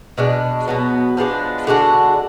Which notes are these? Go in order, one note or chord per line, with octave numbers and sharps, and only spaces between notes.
B2 G#3 D4
B2 F#3 B3
F3 G#3 B3 D4
D3 G#3 D4 F#4